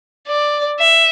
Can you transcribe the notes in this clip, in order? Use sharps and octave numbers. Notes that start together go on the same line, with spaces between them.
D5
E5